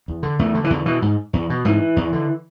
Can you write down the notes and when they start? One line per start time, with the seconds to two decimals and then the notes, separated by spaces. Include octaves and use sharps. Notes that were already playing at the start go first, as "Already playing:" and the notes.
0.08 E2
0.23 D3
0.39 E2 A3
0.54 D3
0.64 E3
0.70 E2 D3
0.86 B2 E3
1.02 G#2
1.33 E2
1.50 B2
1.65 G#2 E3
1.96 E2
2.13 D3